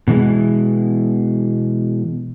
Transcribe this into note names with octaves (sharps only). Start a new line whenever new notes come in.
B2 E3 G#3